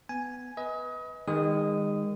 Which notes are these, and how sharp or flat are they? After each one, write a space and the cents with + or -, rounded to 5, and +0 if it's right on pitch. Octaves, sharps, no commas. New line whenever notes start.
B3 +15 G#5 +0
B4 -5 D#5 +30
D#3 +0 G#3 -30 D#6 +0